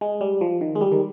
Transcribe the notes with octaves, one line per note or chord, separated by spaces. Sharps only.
G#3
G3
F3
D#3
G#3
G3
D#3